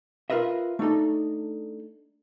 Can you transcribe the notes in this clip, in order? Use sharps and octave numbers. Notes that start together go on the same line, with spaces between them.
F4 A#4 B4 D#5 E5
A3 D4 D#4 A4